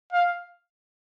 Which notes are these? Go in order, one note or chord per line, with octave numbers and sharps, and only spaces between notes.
F5